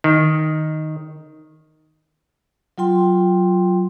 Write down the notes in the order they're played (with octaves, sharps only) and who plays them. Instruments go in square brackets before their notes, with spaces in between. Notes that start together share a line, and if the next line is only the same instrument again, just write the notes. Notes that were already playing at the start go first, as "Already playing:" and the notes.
[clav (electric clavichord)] D#3
[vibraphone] F#3 F4 G5 C6